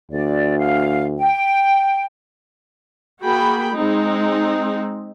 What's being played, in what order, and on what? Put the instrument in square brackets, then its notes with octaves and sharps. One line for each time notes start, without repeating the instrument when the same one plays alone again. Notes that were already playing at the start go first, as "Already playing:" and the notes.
[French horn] D2 [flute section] D5
[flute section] F5
G5
[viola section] A#3 F#4 G#4 G5 B5
G#3 C4 D#4